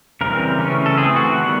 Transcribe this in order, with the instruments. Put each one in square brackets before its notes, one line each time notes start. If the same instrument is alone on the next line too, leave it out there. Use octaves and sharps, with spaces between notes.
[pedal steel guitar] C#3 E3 G3 C4 A#4
C#3 E3 A3 C#4
A4
E3 A3 C4 G#4
F#4
D#3 G3 B3